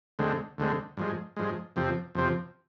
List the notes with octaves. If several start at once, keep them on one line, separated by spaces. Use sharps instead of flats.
D2 D3 G#3 C4
D2 D3 G#3 C4
G2 F3 G#3
G2 F3 G#3
F2 C3 F3 C4
F2 C3 F3 C4